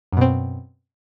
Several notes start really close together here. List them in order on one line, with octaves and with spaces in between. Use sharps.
F#2 B2 C4